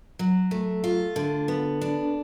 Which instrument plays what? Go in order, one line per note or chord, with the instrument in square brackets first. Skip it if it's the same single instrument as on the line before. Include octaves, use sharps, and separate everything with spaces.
[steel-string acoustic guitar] F#3
A3
F4
D3
B3
D4